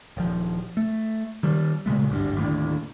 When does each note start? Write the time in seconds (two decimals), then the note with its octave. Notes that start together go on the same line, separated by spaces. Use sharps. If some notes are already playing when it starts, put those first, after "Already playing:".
0.17 D#1 F3
0.77 A3
1.43 D#3 G3
1.86 A#2 C#3 G#3 A3
2.09 G#1 D2 G2
2.37 D#2 A2 D3